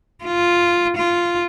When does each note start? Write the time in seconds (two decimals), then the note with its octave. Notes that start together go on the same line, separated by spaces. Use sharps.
0.24 F4
0.96 F4